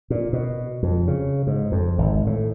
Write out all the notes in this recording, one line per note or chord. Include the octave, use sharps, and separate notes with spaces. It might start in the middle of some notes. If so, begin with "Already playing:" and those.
A#2
B2
F2
C#3
G#2
F2
G#1
A2